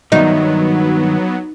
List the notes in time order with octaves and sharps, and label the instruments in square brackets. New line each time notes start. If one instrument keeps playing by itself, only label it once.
[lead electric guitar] G2 D#3 [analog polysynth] F#3 B3 [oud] D#4